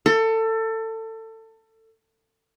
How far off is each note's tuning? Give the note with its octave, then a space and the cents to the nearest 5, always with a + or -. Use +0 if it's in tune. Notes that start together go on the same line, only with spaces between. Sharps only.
A4 +25